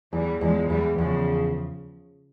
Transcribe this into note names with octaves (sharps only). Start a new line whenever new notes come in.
E2 E3 G3
E2 F3 G#3
E2 E3 G3
E2 C#3 F3